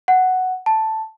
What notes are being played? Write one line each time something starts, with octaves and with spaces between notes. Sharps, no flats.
F#5
A5